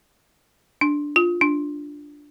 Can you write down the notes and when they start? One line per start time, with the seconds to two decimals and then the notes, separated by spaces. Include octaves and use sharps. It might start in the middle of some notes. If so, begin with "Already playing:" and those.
0.81 D4
1.16 F4
1.41 D4